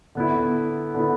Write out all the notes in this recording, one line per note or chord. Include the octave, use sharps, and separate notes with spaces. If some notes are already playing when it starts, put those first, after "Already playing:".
D3 B3 E4
D3 B3 E4